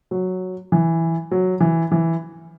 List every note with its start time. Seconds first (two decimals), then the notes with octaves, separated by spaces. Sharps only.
0.11 F#3
0.72 E3
1.31 F#3
1.60 E3
1.92 E3